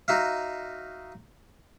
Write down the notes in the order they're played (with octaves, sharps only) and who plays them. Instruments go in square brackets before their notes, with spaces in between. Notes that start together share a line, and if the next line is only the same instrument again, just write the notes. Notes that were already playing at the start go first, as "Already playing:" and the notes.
[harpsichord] D#4 F#4 E5 F5